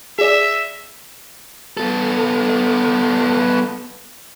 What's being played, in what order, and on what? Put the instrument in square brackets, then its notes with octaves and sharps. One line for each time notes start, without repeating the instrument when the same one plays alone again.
[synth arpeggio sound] G#4 D5 [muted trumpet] E5
[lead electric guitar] B3 A4